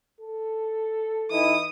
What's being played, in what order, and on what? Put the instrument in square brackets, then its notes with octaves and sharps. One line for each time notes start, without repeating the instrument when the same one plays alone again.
[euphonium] A4
[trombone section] E3 D#4 E4 [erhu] D#6